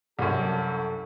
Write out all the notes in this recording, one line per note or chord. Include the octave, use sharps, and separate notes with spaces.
C2 F#2 A4